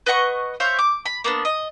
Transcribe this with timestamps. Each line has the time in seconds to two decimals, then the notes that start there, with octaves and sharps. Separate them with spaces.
0.06 B4 D#5 F#5 C#6
0.60 C5 C#5 E5 F5
0.79 D6
1.06 B5
1.24 A#3 B3 D4
1.45 D#5